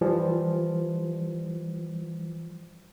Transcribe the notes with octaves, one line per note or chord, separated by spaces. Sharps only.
E3 F3 G3